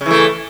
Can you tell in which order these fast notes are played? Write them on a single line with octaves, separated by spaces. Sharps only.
C#3 E3 A3